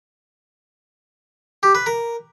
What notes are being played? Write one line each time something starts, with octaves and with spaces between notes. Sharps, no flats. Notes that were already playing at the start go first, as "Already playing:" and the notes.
G4
B4
A#4